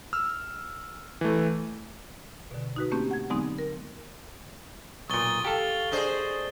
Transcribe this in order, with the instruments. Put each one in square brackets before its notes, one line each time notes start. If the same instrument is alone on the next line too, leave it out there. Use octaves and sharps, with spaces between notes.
[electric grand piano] E6 F6
E3 A3
[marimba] B2 D3
D#4 F#4 B4
A3 A#3 C4 C#4 G4
F#5 G#6
D3 F#3 G#3 B3 C4 D#4
A#4
[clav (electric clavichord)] B1 A#2 [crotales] C#6 A6 G7 [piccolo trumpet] D#6
[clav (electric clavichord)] G4 A4 [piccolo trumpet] F5
[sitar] D4 G#4 C5 [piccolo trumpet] D#5